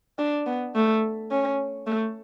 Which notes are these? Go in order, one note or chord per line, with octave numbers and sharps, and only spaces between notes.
D4
B3
A3
C#4
A3